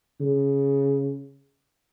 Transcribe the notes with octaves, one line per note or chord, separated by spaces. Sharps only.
C#3